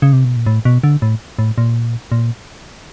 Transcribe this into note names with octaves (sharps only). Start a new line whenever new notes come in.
C#3
C3
B2
A#2
A2
B2
D3
A2
A2
A#2
A#2